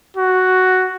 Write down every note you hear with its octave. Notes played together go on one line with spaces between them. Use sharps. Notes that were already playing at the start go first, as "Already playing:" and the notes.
F#4